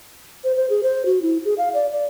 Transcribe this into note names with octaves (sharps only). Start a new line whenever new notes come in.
C5
C5
G#4
C5
F#4
E4
G#4
F5
D5
D5